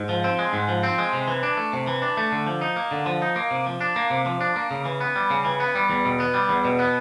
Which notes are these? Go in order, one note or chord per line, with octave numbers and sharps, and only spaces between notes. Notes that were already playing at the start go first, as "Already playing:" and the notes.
Already playing: G#2
F3
C4
G#3
G#2
F3
C4
G#3
C3
E3
D4
A3
C3
E3
D4
A3
D3
F3
D#4
A#3
D3
F3
D#4
A#3
C3
F3
D4
A#3
C3
F3
D4
A#3
C#3
E3
B3
G3
C#3
E3
B3
G3
E2
B2
B3
G3
E2
B2
B3